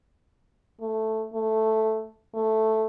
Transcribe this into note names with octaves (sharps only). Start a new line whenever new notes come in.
A3
A3
A3